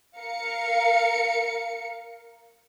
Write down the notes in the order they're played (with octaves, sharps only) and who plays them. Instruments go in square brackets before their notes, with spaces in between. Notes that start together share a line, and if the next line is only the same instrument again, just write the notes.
[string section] A#4 F5 C#7